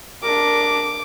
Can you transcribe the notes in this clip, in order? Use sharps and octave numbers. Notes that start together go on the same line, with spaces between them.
D4 A#4 D6